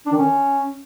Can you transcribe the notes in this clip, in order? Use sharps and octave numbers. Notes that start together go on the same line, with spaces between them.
D4
D#3
C#4